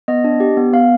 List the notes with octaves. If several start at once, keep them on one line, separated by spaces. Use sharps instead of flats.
B3 D#5
D4
G4
B3
B3 F5